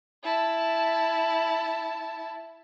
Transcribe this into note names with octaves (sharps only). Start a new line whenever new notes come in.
E4 A5